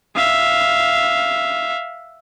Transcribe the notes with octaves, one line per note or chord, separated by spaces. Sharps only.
E5 F5